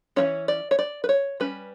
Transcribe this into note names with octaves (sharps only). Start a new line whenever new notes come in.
E3 A3 C#4 C#5
D5
C#5
D5
B4
C#5
G3 C#4 B4